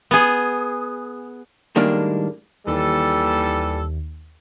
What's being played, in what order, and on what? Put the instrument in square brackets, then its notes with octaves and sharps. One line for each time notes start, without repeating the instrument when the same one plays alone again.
[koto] B3 G#4
[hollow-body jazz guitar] A2 D#3 G3 G#3 A#3 D4
[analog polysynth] D#2 [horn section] E3 G3 A4